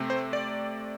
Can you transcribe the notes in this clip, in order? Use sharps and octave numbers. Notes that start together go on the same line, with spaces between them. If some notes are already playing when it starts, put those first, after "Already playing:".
Already playing: C3 A3 C4
C5
D5